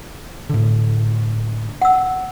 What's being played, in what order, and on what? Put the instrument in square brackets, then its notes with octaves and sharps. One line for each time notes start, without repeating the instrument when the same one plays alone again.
[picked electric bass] A2 D3
[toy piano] F#5 E6